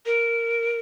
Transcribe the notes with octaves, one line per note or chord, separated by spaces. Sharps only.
A#4